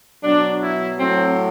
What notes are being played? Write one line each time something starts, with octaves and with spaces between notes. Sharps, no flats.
B2 F#3 D4
E4
A2 F#3 C4